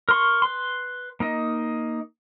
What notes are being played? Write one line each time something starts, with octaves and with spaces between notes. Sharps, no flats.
A#4 C6 C#6
B4 C6
A#3 D#4 D#5